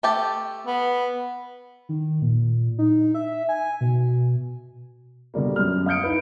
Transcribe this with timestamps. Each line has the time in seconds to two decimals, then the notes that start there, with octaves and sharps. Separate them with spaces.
0.03 A3 G4 A5
0.67 B3
1.89 D#3
2.22 A#2
2.79 D#4
3.15 E5
3.49 G#5
3.81 B2
5.34 B2 D3 G3 A#3
5.56 F#2 F6
5.86 F5 D#6 F6 G6 C#7 D7
6.04 D#4 E4 B4